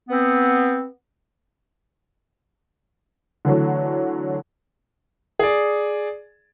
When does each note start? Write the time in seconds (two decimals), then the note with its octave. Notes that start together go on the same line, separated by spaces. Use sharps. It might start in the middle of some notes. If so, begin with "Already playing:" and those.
0.10 B3 C4
3.45 D3 E3 F#3 A3
5.39 G#4 D5